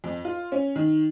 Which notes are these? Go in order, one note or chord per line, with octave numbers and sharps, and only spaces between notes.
F2
F4
C#4
D#3